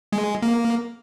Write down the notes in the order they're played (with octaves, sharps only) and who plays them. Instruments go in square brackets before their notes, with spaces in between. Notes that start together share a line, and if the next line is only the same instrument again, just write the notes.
[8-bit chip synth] G#3
A#3